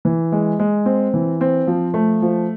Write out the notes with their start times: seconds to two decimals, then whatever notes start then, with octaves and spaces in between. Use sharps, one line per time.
0.05 E3
0.32 G#3
0.59 G#3
0.86 C4
1.14 E3
1.41 C4
1.67 F3
1.94 A3
2.22 F3